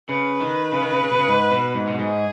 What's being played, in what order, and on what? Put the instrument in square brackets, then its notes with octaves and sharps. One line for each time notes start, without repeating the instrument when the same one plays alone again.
[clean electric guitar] C#3 [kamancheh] B4
[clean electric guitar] D#3
C#3
D#3
C#3
C#3
B2
C#3
G#2
B2
G#2
B2
[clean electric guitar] G#2 [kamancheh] G#4